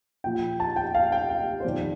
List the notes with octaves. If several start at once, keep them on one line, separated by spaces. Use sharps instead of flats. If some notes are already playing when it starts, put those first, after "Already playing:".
A#2 F3 G5
A5
G5
F5
G5
F5
C5
F2 D#3 D5